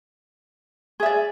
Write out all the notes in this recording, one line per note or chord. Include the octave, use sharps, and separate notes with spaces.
G#4 D5 E5